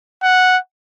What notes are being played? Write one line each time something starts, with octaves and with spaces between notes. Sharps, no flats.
F#5